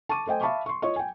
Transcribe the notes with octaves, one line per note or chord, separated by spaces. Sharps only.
A5 C#6 D6 D#7
A3 C5 D#5 G5 G#5
E5 F5 A5 B5 C#6 D6
C6 C#6
F4 C#5 D#5 C#6
G5 G#5